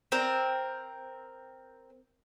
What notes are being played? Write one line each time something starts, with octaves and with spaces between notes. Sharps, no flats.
C4 A#4